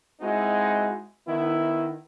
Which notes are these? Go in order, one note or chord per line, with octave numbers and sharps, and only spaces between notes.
G#3 C4 D#4 E4 F#4
D#3 B3 E4